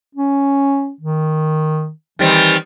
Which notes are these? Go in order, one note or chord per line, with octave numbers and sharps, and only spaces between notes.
C#4
D#3
D#3 E3 G3 C4